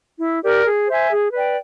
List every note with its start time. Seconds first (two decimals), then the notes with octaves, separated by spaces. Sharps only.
0.19 E4
0.42 G4 A#4 D5
0.66 G#4
0.87 C5 E5 G#5
1.11 G#4
1.33 B4 D5 G5